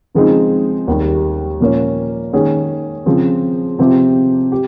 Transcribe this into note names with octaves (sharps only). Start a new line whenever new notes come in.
C#3 F3 G#3 C4 D#4
D#2 D#3 G3
A#2 F3 A#3 C#4
D#3 A#3 C#4 G#4
C#3 F3 C4
C3 F3 C4 G4
G4